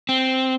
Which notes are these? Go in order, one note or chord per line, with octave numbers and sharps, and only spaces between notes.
C4